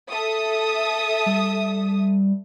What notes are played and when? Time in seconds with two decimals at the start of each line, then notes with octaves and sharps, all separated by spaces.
0.10 A4 E5 D#6
1.26 G3